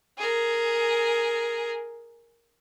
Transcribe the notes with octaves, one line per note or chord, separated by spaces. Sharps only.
G#4 A#4